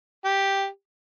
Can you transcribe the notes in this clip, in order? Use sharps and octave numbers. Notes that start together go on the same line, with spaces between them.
G4